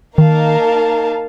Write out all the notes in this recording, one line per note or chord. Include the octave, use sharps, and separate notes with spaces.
D#3 A#3 D#4 A#4 F5 A5